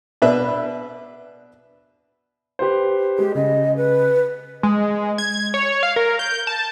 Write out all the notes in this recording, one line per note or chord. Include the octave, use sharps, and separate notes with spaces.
B2 D4 B4 E5
G4 B4 C5
G#3 G4
C#3 D#5
B4
G#3
G#6
C#5
F5
A#4
G6
A5